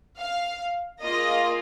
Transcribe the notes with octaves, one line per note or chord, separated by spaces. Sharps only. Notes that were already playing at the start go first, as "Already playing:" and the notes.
F5
A#3 F4 G#4 D#5